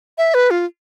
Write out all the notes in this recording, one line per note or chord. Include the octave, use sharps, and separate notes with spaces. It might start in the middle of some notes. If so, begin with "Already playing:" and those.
E5
B4
F4